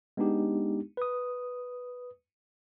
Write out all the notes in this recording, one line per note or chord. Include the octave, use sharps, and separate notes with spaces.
G#3 B3 D4 D#4 G4
B4 D#6